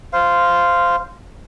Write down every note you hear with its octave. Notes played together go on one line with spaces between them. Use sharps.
C5 F5